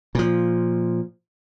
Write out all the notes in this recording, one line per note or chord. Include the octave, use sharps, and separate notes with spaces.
A#2 F3